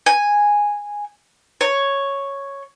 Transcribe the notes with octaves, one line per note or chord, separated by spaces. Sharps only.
G#5
C#5